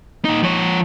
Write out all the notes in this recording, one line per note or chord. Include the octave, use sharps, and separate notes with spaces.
A#2 D#4
F3 C#5